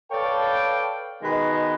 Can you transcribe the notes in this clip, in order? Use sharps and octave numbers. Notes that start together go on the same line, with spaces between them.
A4 B4 C#5 D5 F5 G5
B2 D#3 G#3 B4 D#5